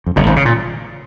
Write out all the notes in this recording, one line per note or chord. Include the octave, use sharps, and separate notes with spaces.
F2
F#1 F#2
G#1 G#2
C#3
A#2